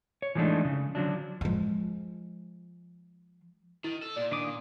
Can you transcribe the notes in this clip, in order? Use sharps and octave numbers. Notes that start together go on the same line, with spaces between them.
C#5
E3 F3 G#3 A3 D4 D#4
C#3
D3 F3 F#3 D4
F3 G#3
D#3 E4
A4
A#2 D5
D#3 D4 D6 D#6
A#3